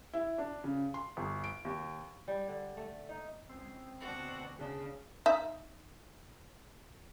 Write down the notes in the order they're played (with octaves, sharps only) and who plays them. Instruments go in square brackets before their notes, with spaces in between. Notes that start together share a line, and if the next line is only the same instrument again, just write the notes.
[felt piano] E4
D4
C#3
C6
G1
D7
D#2
[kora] G3
D3
A3
D#4
[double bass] C#2 G#3 [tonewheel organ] C4
[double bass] D2 B2 [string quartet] D4 F#4
[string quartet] C#3 [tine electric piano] D4 G#4
[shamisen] D#4 E5